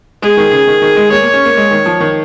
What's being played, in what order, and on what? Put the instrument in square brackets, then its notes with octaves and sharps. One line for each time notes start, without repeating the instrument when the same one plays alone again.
[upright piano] G#3 [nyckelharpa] G#4
[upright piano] D#3
C#3
D#3
D#3
G#3
[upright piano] A#3 [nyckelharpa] C#5
[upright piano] A#3
C#4
A#3
G#3
D#3
F3
D#3